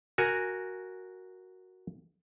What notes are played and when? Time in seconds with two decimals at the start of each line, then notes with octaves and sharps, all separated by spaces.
0.18 F#4 A#4 G#5